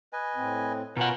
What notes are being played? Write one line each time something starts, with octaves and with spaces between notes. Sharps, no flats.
B4 D#5 G#5
A2 C4
B2 C#4 F4 A#4 B4 F#5 A#5